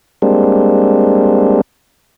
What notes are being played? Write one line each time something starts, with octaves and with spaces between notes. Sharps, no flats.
G3 G#3 A#3 C4 D4